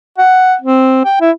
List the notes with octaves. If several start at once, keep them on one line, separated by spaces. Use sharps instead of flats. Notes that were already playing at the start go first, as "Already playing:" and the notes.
F#5
C4
G5
E4